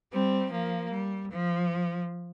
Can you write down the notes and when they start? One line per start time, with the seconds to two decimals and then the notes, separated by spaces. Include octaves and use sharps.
0.12 G3 C4
0.52 F3 A#3
0.91 G3
1.30 F3